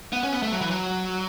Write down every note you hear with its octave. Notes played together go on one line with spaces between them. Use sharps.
B3
C#4
B3
A3
F#3
E3
F#3